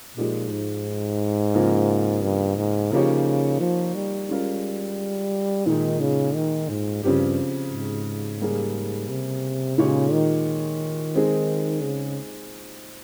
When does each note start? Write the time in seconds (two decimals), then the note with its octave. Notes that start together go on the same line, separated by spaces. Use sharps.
0.16 A#2 F3 G#3 D#4 G4
0.52 G#2
1.54 C#3 F3 A#3 F4
2.23 G2
2.57 G#2
2.92 C#3 F3 A#3 D#4 G4 C#5
3.60 F3
3.95 G3
4.29 G#3 C#4 F4 A#4
5.66 A#2 D#3 G#3 D#4
6.00 C#3
6.35 D#3
6.69 G#2
7.03 G2 C#3 F3 C4 G4
7.72 G#2
8.41 C#3 G3 A#3 C#4 G#4
9.09 C3
9.78 A#2 C#3 G#3 D#4 G4 C#5
10.12 D#3
11.15 G#3 C4 D#4 G#4
11.83 C#3